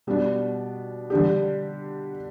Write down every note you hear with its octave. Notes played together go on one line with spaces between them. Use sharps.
B2 G3 B3 D4
D3 G3 D4 G4